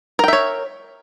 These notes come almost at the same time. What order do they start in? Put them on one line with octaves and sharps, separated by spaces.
A#4 G5 E5 C#5